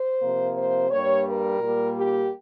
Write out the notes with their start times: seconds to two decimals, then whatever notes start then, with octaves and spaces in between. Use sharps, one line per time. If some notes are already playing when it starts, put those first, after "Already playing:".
Already playing: C5
0.19 C3 F3 A#3
0.55 C5
0.89 G2 G3 A#3 C#5
1.25 A#4
1.60 A#2 G3 A#3
1.96 G4